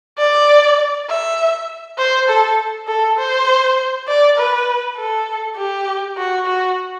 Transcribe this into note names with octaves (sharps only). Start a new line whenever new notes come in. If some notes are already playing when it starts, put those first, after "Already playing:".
D5
E5
C5
A4
A4
C5
D5
B4
A4
G4
F#4
F#4